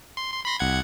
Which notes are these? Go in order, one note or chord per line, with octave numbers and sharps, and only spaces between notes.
C6
C6
B5 C6 A#6
C2 F#5 G#6